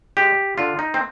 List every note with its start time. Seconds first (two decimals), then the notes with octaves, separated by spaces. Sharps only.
0.17 G#3 G4
0.58 D3 F4
0.79 D#4
0.94 C4